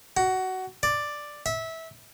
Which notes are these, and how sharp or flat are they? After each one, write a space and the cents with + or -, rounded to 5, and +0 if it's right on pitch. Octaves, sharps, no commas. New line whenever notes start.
F#4 +15
D5 +5
E5 -20